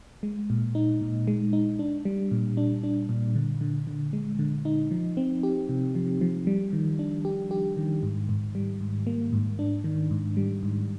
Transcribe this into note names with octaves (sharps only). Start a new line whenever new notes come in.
G#3
A#2
D#4
A#2
G#3
D#4
D4
G3
A#2
D4
D4
A#2
D3
D3
D3
G#3
D3
D#4
F3
C4
G4
C3
F3
F3
G3
D#3
D4
G4
G4
D#3
G#2
G#2
G3
G#2
A#3
G#2
D4
D#3
G#2
G3
G#2